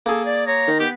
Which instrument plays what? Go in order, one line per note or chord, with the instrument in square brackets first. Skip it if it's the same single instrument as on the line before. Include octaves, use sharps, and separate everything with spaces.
[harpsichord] A#3 G#4 [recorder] A4
[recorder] D5
[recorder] C#5 [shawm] A#5
[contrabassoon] D#3
[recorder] B3 [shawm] G4